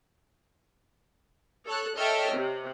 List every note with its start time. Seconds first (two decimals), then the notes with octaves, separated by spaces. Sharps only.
1.66 A4 C#5 F#6
1.98 A4 C#5 D#5 E5 G5 F6
2.35 C3